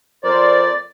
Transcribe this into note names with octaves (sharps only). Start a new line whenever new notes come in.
F2 A#4 C5 D5